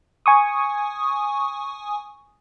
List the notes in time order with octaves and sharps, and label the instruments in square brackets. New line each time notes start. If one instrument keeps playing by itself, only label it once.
[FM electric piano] G#5 C#6 D#6